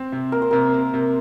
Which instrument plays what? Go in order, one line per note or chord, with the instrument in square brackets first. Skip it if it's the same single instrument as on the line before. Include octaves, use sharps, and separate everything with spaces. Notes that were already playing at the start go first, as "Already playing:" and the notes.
Already playing: [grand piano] C4 [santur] C5
[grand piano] C3
[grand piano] A#3 [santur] A#4
[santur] C5
[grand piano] C3 [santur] A#4
[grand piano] A#3
C3